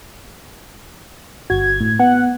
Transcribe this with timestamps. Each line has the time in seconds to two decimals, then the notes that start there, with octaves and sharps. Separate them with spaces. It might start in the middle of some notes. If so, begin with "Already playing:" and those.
1.50 G1 F#4 G#6
1.81 A2
1.99 B3 F#5